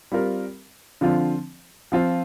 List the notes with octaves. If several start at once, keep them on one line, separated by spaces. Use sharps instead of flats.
G3 C4 F4 A#4
D3 F3 C4 F4
F3 C4 F4 C5